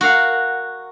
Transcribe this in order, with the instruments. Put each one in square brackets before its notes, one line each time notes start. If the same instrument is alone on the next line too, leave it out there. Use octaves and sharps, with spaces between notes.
[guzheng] F#4 A#4 F5 F#5